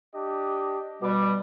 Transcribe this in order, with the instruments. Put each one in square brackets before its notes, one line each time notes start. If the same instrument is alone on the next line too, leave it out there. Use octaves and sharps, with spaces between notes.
[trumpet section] D4 G4 D#5
[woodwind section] B2 G3 [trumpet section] B4 D6